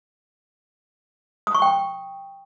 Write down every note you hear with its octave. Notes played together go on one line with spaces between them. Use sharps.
D#6
C#6
G5